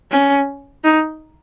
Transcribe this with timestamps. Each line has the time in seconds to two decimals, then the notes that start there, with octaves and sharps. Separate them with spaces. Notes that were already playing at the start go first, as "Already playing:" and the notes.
0.11 C#4
0.84 D#4